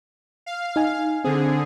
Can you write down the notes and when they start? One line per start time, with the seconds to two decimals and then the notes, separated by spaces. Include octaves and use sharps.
0.46 F5
0.76 D#4 G#5
1.24 D3 C4 G#4